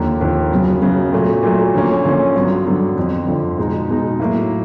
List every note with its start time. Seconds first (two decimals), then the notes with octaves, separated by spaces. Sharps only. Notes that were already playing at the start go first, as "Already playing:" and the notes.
Already playing: D#2 D3 F3 A#3
0.21 D#2 D3 F3 A#3
0.52 F#2 C#3 F#3 B3
0.82 F#2 C#3 F#3 B3
1.12 A#2 F#3 A3
1.43 A#2 F#3 A3
1.74 D3 F3 A#3 C#4
2.05 D3 F3 A#3 C#4
2.35 G2 D3 F#3 B3
2.66 G2 D3 F#3 B3
2.97 F2 D3 F3
3.27 F2 D3 F3
3.58 B2 G#3 B3 D#4
3.88 B2 G#3 B3 D#4
4.20 A2 F#3 A#3